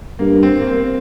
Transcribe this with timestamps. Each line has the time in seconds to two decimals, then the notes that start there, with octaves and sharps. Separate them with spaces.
0.19 G2 A#3
0.43 C4
0.61 A#3
0.67 C4